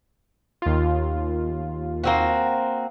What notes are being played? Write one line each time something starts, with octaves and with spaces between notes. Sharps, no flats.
D#2 F4
A#3 C4 F#4